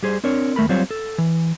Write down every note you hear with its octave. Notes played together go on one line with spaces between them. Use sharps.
G3 G#4 C5
C4 D4 A#4 C#5
D#2 A3 A#4 B5
F#3 G3 C4 F4 C5 C#5
A4
E3